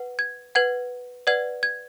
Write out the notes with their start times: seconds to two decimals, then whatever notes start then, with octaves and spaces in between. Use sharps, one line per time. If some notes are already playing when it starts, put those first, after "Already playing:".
Already playing: B4 F#5
0.19 G#6
0.55 B4 F#5 G#6
1.27 B4 D5 F#5 G#6
1.63 G#6